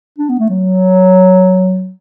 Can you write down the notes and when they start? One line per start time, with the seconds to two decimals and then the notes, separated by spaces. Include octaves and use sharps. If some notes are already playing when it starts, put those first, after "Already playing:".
0.18 D4
0.29 B3
0.39 A3
0.49 F#3